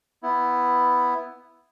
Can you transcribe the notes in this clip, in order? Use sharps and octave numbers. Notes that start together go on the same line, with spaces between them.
B3 E4